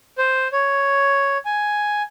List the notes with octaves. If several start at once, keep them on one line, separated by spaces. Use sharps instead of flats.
C5
C#5
G#5